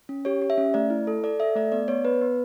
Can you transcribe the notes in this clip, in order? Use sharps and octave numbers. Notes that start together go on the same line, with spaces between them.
C#4
G4 C#5
G4
E5
C#4
A3 D5
E4
A4
A4 D5
A4 E5
A3 D5
B3 D5
B3 C#5
B3 B4
B3